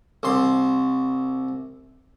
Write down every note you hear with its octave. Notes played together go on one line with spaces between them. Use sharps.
C2 C6